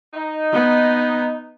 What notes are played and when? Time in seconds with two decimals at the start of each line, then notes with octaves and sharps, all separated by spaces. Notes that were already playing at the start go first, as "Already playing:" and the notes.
0.14 D#4
0.53 B3